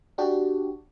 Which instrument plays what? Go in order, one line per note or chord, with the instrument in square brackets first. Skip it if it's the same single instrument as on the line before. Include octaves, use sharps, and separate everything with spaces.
[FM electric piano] D4 F#4 G4